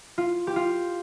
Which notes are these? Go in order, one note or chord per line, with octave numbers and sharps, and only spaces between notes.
F4
G4
F4